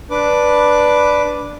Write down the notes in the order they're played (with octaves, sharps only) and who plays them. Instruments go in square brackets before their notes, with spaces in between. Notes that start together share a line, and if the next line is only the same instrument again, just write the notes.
[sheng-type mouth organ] D4 B4 D6